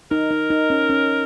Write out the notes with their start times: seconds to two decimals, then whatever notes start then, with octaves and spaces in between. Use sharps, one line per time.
0.11 D#4 A#4
0.31 D#4
0.50 D#4
0.70 C#4
0.90 C#4